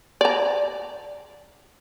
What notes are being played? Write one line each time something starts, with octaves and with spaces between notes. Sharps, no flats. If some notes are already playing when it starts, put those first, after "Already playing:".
D5 A#5